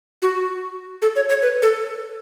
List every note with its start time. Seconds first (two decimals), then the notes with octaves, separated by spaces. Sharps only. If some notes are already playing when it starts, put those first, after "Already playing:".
0.22 F#4
1.02 A4
1.16 C#5
1.29 C#5
1.42 B4
1.62 A4